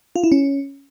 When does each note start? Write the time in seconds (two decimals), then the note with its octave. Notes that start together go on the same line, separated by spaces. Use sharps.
0.16 F4
0.24 E4
0.32 C#4